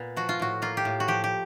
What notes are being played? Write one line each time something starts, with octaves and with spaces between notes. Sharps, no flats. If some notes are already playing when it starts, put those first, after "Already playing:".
Already playing: A#2 B3
F3 F#4
F4
A2 F#4
A#3 F4
G4
A2
F#4
F3 G4
G4